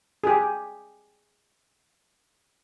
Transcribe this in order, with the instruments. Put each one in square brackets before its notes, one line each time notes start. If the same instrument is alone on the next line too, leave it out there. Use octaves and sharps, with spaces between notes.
[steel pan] G4 G#4